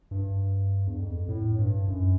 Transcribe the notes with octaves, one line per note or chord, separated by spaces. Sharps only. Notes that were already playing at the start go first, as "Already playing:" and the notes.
G2
E2
F2
A2
G2
F#2